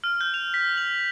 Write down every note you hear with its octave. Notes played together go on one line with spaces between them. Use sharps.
F6
G6
F7
B6
F#7